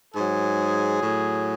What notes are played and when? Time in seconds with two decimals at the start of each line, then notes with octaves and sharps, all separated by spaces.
0.14 G#2 F#3 G#4
1.02 A2 F#3